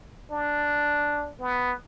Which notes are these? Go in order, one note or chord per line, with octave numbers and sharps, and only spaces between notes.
D4
B3